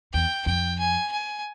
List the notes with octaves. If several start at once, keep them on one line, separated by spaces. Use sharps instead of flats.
E2 G5
F2 G5
G#5
G#5